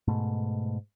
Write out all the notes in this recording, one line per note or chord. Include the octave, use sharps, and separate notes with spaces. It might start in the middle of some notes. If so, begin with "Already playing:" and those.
G#2 B2 A3